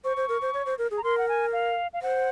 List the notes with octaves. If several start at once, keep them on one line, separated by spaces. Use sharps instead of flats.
C5 C#6
C5
A#4
C5
C#5
C5
A#4
G#4
A#5
A#4 C6
F#5
G#5
F5
F5
C5 F#5